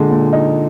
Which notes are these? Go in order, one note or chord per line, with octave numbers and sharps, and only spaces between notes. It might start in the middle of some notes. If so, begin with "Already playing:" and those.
Already playing: A#2 D3 G#3
A#2
D#4